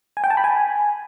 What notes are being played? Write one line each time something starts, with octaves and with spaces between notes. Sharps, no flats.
G#5
G5
A5
B5
G#5